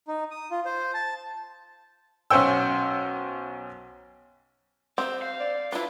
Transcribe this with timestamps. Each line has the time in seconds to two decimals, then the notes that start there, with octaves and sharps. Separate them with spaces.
0.08 D#4
0.31 D#6
0.51 F4
0.65 C5
0.94 A5
2.30 B1 C#4 C5 F#5 G5 E6
4.98 C4 G4 C5
5.22 F5
5.40 D5
5.72 D4 E4 F4 B4